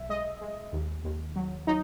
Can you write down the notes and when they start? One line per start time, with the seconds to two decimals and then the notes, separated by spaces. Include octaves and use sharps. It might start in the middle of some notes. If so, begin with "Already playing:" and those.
Already playing: B1 E5
0.09 G#3 D#5
0.41 G#3
0.73 D#2
1.04 D#2
1.36 F#3
1.67 F#3 D#4